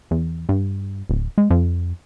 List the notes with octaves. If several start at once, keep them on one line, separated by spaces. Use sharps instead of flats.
E2
G2
D1
G#3
F2